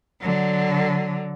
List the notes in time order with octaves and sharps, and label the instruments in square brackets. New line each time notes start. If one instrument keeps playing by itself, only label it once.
[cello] D3 F#3